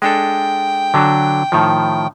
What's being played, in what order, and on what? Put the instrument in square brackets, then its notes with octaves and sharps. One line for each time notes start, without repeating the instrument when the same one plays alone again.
[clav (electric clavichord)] G#3 D4 A4 [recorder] G5
[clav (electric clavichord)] D3 F#3 D4
A2 D#3 F3